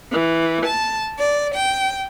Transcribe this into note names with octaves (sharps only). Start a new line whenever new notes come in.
E3
A5
D5
G5